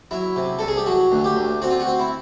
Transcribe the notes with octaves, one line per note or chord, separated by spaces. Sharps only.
F#3 E4
C3
C2 A4
G#4
G4
F#3 F#4
D2
G4
D2
C4 F#4
F4
F#4
C4
E4